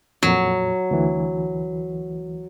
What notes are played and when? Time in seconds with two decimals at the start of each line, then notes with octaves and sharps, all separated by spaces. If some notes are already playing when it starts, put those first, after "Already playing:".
0.23 F2 A#2 F#3
0.91 D2 E3